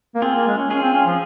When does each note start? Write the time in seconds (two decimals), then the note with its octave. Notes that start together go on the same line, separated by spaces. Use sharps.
0.15 A#3
0.22 C4 F4 G#4
0.35 A#3
0.47 G#3
0.58 C#4
0.70 C#4 F4 G#4
0.82 C4
0.94 C#4
1.06 F3